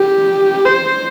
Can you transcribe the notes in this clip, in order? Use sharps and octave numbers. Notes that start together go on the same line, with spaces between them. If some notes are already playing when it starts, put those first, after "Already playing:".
Already playing: G4
C5